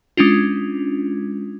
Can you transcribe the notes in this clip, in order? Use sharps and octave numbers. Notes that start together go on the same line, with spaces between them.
G#3 C#4 D4 F4